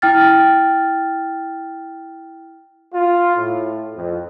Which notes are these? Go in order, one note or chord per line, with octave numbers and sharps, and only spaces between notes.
E4 G5 F6 A6
F4
A2
F2